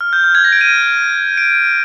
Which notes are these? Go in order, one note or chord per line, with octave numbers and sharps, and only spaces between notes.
F6
G6
F6
G#6
A#6
D7
D#7
D7